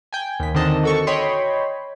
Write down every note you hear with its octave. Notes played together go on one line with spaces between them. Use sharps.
G5 G#5
D#2 B6
D3 D#3 C4 D#5 A5
F#4 A4 C#6
C#5 D#5 G5 B5 C6